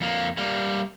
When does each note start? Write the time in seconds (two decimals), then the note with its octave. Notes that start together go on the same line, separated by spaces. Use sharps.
0.01 F2 A#3
0.37 G3 A#3